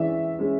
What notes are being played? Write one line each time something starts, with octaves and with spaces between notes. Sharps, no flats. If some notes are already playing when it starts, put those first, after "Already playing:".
Already playing: E3 G#3 C#4 D5 E5
G#3 C#4